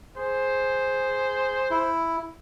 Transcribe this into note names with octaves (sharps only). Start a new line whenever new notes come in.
G#4 C5
E4